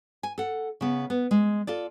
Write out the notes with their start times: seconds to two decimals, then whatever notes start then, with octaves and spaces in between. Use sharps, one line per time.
0.23 G#5
0.38 A4 F#5
0.81 C#3 B3
1.10 B3
1.31 G#3
1.67 F4 A4 D5